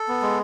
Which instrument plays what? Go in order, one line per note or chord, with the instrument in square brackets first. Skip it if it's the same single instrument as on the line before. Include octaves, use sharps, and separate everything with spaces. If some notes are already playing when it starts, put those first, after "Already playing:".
Already playing: [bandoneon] A4
[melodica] B3
G#3